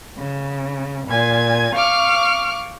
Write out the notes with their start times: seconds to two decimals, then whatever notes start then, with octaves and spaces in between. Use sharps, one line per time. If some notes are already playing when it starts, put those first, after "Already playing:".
0.17 C#3
1.08 A#2 G#5 G#6
1.74 F5 C#6 D6 F6